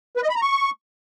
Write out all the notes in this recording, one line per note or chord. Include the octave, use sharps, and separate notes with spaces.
B4
D#5
B5
A#5
C#6